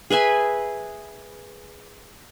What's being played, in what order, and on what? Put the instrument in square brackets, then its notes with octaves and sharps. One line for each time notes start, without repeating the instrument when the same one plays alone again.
[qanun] G#4 B4 E5 G#5